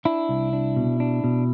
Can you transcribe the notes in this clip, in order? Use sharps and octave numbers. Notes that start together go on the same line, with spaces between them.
D4 E4
C2
D4
B2
D4
B2